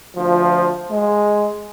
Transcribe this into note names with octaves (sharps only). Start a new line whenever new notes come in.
D2 F3
G#3